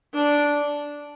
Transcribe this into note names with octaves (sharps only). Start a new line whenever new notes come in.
D4